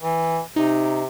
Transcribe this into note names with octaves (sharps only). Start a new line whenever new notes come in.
E3
C3 D#4